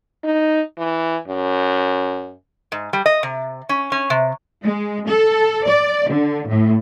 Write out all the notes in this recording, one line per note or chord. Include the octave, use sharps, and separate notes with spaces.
D#4
E3
F#2
G#2
G3
D#5
C3
C#4
C#4
C3
G#3
A4
D5
D3
A2